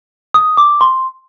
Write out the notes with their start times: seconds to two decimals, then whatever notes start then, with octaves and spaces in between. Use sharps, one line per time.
0.34 D#6
0.57 D6
0.81 C6